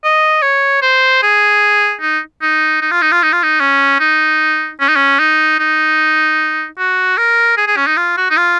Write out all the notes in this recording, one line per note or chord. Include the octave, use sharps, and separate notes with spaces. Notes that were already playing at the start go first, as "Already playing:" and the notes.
D#5
C#5
C5
G#4
D#4
D#4
D#4
F4
D#4
F4
D#4
F4
D#4
C#4
D#4
C#4
D#4
C#4
D#4
D#4
F#4
A#4
G#4
G#4
C#4
D#4
F4
F#4
D#4
F4